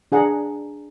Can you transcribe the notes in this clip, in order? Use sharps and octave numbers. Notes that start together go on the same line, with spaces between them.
D4 G#4 F#5 A#5